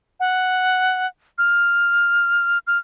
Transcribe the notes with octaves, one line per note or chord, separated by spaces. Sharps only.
F#5
F6
F6